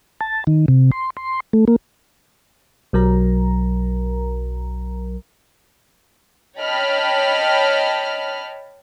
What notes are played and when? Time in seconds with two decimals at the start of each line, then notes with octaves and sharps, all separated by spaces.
0.21 A5
0.47 D#3
0.68 C3
0.92 C6
1.17 C6
1.53 A3
1.68 A#3
2.93 B1 F#3 A#4 A#5
6.59 C#5 D#5 G5 A5 B5 F6